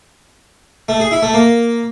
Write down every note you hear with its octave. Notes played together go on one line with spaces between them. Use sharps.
A3
G#4
E4
A3
A#3